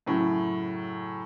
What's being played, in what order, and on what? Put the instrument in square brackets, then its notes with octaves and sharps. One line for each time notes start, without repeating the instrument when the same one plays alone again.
[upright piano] F#2 A2 C#3 F#3